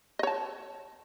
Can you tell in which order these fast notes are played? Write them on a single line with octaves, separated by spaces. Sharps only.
D#5 C#5 A5